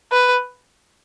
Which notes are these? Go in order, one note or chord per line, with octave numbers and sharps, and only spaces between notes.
B4